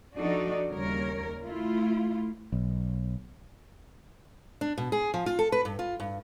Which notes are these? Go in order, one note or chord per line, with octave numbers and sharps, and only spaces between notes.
F3 D4 D#4 F#4 A4 D5
D#2 C#3 G3 A#4 C#5
A3 E4 F4
B1
D4
B2
G#4
F3
F4
A4
B4
G2
F4
G2